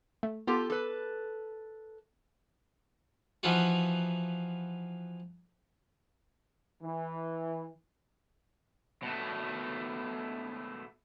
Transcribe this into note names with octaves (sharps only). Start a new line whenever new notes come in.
A3
B3 F4 G4 A4
A4 B4
E3 F3 B3 D#4 F4 F#4
E3
B2 A3